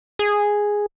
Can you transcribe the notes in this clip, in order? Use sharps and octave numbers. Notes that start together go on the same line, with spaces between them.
G#4